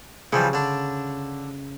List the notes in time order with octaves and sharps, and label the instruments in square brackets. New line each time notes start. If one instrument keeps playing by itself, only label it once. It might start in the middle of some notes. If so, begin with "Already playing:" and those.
[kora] C#3 [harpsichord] E3 F3 G3
[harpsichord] D3 D4